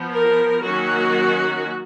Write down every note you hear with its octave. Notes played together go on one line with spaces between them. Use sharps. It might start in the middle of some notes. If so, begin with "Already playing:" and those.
Already playing: F3 B3
A#4
D#3 F#3 A#3 C#4 F#4